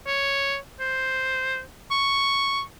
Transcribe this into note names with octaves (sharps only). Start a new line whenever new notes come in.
C#5
C5
C#6